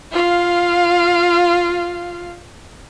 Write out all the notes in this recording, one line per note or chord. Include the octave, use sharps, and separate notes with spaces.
F4 F5